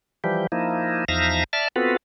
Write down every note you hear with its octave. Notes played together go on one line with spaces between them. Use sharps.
E3 F3 G3 G4
F3 A#3 D#4 E4
E2 F3 D#4 E5 F5 A#6
D5 E5 A5 F6
B3 C4 F4 F#4 A4 B4